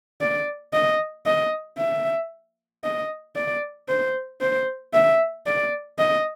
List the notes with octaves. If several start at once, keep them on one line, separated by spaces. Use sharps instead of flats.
D5
D#5
D#5
E5
D#5
D5
C5
C5
E5
D5
D#5